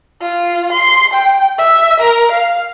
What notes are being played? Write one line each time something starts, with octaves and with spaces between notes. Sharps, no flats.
F4
C6
G5
E5
A#4
F5